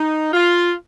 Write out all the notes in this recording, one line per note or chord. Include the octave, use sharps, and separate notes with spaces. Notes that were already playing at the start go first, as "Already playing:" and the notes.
Already playing: D#4
F4